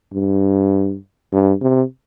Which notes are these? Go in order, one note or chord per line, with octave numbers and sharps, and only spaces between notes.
G2
G2
C3